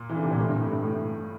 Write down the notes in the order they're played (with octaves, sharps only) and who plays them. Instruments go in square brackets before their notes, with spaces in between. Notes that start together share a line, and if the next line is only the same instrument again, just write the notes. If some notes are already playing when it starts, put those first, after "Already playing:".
Already playing: [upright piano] A#2
E3
D3
C3
A#2
A2
G2
A2
G2
A2